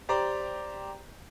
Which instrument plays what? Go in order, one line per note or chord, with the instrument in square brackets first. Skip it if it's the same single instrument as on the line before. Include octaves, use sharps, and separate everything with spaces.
[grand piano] G4 C5 D5 A#5